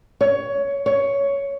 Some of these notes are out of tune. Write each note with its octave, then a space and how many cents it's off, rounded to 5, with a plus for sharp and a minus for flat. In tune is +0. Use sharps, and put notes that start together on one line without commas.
C#5 +15
C#5 +10